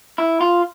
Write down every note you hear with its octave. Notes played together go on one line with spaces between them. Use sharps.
E4
F4